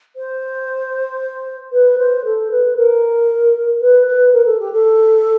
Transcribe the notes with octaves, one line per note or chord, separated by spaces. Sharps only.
C5
B4
C5
A4
B4
A#4
B4
B4
A#4
A4
G4
A4